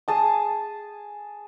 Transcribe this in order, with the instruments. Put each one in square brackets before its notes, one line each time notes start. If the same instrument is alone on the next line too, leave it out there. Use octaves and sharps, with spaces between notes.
[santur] G#4 A5 D#6